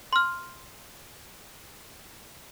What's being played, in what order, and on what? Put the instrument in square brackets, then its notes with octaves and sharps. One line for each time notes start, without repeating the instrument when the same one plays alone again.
[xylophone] C6 F6